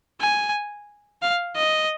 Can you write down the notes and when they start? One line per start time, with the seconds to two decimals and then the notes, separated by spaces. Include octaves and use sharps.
0.21 G#5
1.22 F5
1.56 D#5